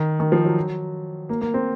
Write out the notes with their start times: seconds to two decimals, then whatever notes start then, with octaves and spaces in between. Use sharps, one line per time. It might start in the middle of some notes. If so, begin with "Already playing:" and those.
Already playing: D#3
0.20 D#3
0.32 F3
0.45 F#3
1.29 A#3
1.41 A#3
1.54 C4